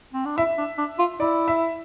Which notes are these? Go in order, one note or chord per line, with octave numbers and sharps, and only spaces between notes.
C4
D4
E4 E5
D4
D4
F4
E4 D5
E5